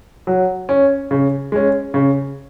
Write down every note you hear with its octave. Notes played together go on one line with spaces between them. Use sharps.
F#3
C#4
C#3
G#3 C#4
C#3